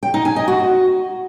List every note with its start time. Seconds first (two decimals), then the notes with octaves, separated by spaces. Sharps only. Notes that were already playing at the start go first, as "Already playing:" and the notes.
0.03 G5
0.14 D#4
0.25 G#5
0.36 D#5
0.48 F#4